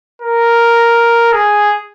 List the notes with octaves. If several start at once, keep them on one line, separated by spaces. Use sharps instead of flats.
A#4
G#4